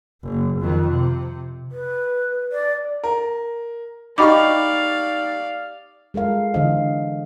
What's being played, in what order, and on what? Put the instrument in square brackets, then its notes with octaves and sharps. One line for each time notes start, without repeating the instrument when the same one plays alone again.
[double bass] F#1
F2 D#3
C3
[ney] B4
D5
[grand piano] A#4
[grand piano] D#4 G4 C#6 [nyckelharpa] D5 F5 [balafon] D#5 B5 D6
[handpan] G#3 A4 A#4 F5
D3 E3 D4 C5 D#5 F5